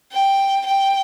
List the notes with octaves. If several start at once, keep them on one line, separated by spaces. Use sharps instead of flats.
G5
G5